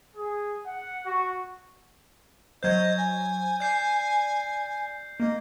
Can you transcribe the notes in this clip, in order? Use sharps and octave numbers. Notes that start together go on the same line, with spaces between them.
G#4
F#5
F#4
F#3 C5 D#5 G6 G#6
G#5
D5 G6 C7
A#3 D#5